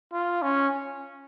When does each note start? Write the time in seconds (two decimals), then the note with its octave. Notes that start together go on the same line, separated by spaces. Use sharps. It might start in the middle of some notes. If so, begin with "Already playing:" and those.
0.13 F4
0.42 C#4